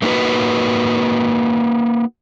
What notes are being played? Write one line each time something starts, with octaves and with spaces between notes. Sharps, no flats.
A3 A#3 D#4 F#4 B4